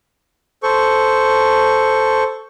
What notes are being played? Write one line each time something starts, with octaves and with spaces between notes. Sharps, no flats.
A4 C5 C#6